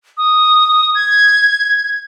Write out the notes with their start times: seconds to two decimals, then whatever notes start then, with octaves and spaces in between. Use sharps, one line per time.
0.18 D#6
0.95 G#6